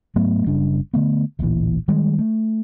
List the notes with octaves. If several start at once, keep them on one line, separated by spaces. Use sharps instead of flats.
G#2 F#3 A3 B3
F#1 C#3 G3 D4
D3 A3 B3
D1 A1 A#2 E3
D#3 G3 G#3
A3